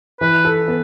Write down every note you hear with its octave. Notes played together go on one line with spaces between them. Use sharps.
E3 B4
A4
B3